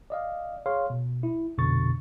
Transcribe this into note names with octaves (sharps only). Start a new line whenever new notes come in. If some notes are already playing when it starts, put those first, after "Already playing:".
D5 D#5 F5
G#4 C#5 F5 C6
B2
E4
A#1 F2 B2 D3 C#6 A6